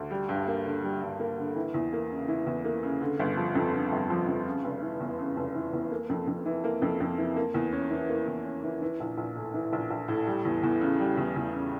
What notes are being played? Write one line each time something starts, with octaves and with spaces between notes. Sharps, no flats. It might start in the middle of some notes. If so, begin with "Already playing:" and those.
Already playing: D2
G3
G2
A#3
D3
G3
G2
A#3
D3
E3
E2
A#3
C#3
E3
E2
A#3
C#3
D3
G1
F3
F2
D3
G1
F3
F2
C#3
F1
E3
E2
C#3
F1
E3
E2
A#3
F2
F2
E3
A#3
F2
F2
E3
A#3
E2
C#4
E3
A#3
E2
C#4
E3
E3
A#1
A#1
A2
E3
A#1
A#1
A2
G3
E2
E2
C#3
G3
E2
E2
C#3